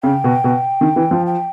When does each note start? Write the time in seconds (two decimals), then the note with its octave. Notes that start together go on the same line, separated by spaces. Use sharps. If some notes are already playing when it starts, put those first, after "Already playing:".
0.03 C#3 G5
0.24 B2
0.44 B2
0.81 D#3
0.96 E3
1.11 F3
1.26 G5